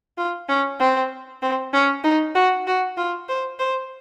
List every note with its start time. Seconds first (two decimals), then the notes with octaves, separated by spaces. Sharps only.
0.17 F4
0.49 C#4
0.80 C4
1.42 C4
1.73 C#4
2.04 D#4
2.35 F#4
2.67 F#4
2.97 F4
3.29 C5
3.59 C5